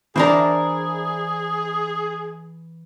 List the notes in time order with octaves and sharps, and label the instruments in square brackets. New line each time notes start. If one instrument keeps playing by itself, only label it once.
[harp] E3 A#5 [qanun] D4 A#4 C5 [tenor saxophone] G#4